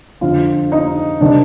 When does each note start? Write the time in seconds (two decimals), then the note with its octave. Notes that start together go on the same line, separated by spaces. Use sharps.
0.21 F2 D3 F3 F4
0.72 D#4
1.21 C3 D#3 D4